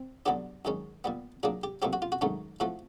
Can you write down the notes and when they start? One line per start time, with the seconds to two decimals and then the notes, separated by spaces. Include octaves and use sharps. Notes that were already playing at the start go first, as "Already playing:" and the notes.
Already playing: C4
0.26 G2 D3 F#3 B3 D4 G4
0.65 F#2 D#3 G#3 C#4
1.04 A#2 G3 B3
1.43 A#2 F#3 A#3 D4 G#4
1.63 G4
1.82 A#2 F#3 A3 C4 G4
1.93 F#4
2.02 F4
2.12 F#4
2.21 G#2 D#3 F#3 A3 C#4
2.60 A2 F3 A3 F#4